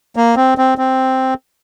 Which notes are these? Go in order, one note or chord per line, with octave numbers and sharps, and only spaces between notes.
A#3
C4
C4
C4